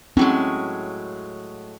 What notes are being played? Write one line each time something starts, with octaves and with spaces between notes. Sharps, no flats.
A2 F#3 G#3 C4 C#4